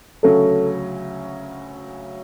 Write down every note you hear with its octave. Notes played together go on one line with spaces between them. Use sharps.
D2 C#3 F#3 C#4 A4